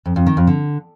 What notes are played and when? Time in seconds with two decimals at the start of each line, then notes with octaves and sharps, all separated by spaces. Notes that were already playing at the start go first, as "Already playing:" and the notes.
0.06 F2
0.16 F2
0.26 D#3
0.37 F2
0.47 D3